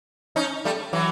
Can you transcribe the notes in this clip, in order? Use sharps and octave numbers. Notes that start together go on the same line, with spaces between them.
C#4 D#4
G3 A3
E3 F#3